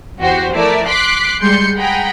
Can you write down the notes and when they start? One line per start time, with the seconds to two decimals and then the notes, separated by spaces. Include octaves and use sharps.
0.19 E2 F#4 G4 C5
0.53 F3 A3 E4 A#4 D5 E5
0.87 C6 D6 F#6 B6 C7
1.41 G3 G#3 C6 G6 C#7
1.77 G#4 F#5 G5 A#5 B5